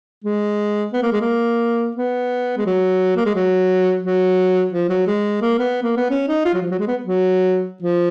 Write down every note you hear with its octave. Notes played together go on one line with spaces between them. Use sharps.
G#3
B3
A#3
G#3
A#3
B3
G#3
F#3
A#3
G#3
F#3
F#3
F3
F#3
G#3
A#3
B3
A#3
B3
C#4
D#4
F4
F#3
F3
F#3
G#3
B3
F#3
F3